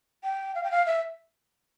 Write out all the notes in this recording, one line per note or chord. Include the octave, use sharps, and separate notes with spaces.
G5
F5
G5
F5
E5